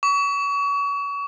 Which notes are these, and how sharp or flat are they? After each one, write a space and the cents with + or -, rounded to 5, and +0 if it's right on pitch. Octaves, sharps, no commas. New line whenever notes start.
C#6 +35